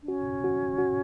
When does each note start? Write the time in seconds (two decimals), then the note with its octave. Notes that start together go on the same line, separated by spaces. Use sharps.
0.02 D4
0.08 C#4 F#4
0.44 F#4
0.78 F#4